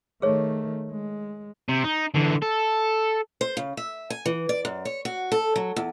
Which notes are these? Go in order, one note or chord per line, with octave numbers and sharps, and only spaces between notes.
D#3 A3 G#4 C#5
G#3
C3
D#4
D3 E3
A4
C5
C#3
E5
G#5
E3
D5
F#2
C#5
F#4
A4
F#3
E2